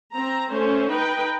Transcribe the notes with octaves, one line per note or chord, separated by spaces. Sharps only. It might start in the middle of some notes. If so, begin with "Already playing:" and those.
C4 A#5
A3 C#4 C5
D#4 B4 G5